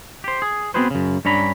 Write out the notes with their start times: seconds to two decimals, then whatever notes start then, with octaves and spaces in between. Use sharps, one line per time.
0.24 G4 C5
0.42 G#4
0.74 B3 C4 F#4 G#4 B4 C5
0.90 F#2 C#3
1.25 G2 C#4 D4 A#5 B5